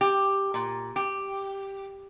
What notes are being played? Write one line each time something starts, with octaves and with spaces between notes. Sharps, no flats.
G4
A#2
G4